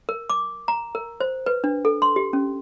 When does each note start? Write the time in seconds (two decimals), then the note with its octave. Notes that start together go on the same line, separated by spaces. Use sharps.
0.09 A#4
0.30 D6
0.68 A#5
0.95 A#4
1.20 C5
1.46 B4
1.64 D4
1.85 A4
2.02 C6
2.16 G4
2.33 C#4